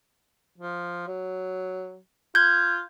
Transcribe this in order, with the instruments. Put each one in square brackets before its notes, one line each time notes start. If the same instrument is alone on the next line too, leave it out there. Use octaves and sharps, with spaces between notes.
[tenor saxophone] F3
F#3
[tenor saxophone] F4 [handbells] G6 G#6